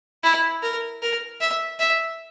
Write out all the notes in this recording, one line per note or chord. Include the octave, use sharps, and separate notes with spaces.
E4
A#4
A#4
E5
E5